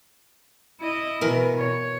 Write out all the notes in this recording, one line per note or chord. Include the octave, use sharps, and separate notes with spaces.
E4 D#5
B2 E3 A#4
C#5